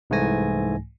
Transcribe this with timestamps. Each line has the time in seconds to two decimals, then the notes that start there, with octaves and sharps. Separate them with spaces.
0.10 C2 G#2 E3 A3 G#5 A#6